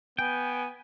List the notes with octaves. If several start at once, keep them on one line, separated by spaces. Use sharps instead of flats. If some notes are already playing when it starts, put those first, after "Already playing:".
B3 G5 G#5